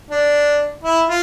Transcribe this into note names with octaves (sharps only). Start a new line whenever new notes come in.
D4
E4
F4